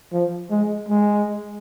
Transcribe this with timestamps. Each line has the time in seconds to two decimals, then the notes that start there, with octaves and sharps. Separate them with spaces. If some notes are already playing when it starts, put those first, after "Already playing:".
0.13 F3
0.50 G#3
0.89 G#3